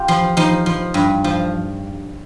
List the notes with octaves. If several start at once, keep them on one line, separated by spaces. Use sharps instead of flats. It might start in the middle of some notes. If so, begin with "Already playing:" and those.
Already playing: F4 G4
F3
F3 D#4
F3
G2
F3